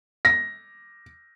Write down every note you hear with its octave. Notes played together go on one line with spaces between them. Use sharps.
A#6